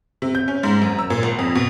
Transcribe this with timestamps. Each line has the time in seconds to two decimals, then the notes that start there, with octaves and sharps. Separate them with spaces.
0.22 C3
0.35 G6
0.48 C#4
0.63 G#2
0.82 F#2
0.99 E6
1.10 A#2
1.23 G#1
1.39 F2
1.55 B2